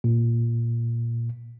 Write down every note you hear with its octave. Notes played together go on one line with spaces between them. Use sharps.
A#2